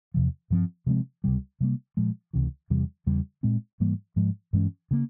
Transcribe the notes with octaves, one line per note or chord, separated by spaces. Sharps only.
E2 C3 F3
G2 F3 C4
C3 F3 G#3 C4
C#2 C3 G3
C3 G3 A#3
A#2 F3 G#3
C#2 C3 E3
E2 C3 G3
E2 C#3 G3
A#2 G#3 C4
G#2 E3 G3 A#3
G#2 F3 G#3
G2 E3 G#3 C#4
C#3 E3 A#3